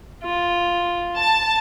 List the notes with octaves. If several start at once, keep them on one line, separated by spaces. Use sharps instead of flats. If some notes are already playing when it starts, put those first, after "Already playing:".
F4
A5